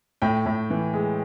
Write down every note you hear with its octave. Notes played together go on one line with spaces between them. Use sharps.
A2 G5
A2
E3
G#3